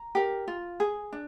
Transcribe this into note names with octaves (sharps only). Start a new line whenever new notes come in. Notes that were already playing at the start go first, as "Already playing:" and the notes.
Already playing: A#5
G4 A#4
F4
G#4
D4